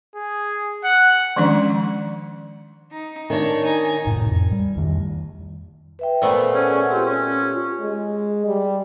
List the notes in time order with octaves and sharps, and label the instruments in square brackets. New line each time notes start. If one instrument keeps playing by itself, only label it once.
[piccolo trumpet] G#4
F#5
[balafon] D#3 F3 G#3 C#4 D4 D5
[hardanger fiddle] D#4
[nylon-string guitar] D#3 D4 [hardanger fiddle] C#5
[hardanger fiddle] D#4 G#5
[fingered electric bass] A2 C3
F2
G3
F2 D#3
[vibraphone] B4 E5 G5
[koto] A#2 A3 B3 [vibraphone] C5
[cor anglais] C#4 [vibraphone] G#4 D5 F#5
[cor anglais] C4 [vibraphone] F4 G4
[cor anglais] C#4
[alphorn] G#3
G3